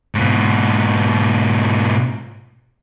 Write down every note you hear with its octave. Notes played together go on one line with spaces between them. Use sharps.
G#2 B2